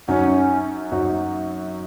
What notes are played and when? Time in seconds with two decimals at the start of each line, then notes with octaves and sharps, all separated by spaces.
0.08 F#2 F#3 C#4 D#4 F#4
0.92 F#2 F#3 D#4 F#4